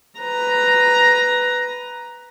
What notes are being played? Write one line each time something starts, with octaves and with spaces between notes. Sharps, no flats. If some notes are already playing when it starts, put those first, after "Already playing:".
B4 A#5